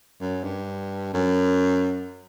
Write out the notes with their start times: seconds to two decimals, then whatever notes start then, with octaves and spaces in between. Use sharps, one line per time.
0.21 F#2
0.44 G2
1.14 F#2